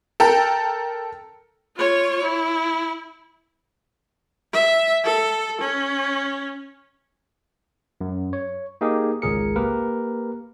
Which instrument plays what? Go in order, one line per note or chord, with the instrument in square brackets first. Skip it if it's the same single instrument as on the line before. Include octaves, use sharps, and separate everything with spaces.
[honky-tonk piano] A4 A#4 G5 A#5
[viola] F4 C#5
E4
E5
A4
C#4
[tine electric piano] F#2
C#5
A#3 D#4 G4 G#4 A#4
G#1 C#2 G#4 A#4 C#7
A#3 G4 A#4 B4